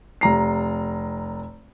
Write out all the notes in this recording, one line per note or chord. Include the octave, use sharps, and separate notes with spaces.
F1 A#5 C7